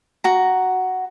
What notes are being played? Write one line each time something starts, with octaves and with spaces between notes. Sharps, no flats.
F#4 A#5